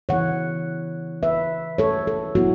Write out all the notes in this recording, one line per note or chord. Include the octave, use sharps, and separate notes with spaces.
C#3 E3 B3 E4 C#5 F#5
B4 E5
A4 C#5
A4
F#3 B3 E4 F#4